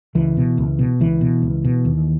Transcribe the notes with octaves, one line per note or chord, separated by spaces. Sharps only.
C#2 E3
B2
C#2
B2
C#2 E3
B2
C#2
B2
D#2